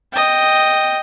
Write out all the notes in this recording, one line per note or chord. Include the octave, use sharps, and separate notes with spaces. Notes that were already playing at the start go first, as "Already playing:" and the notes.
D#5 G5